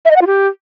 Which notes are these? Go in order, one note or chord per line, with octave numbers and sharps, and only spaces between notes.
E5
D#5
F#5
F4
G4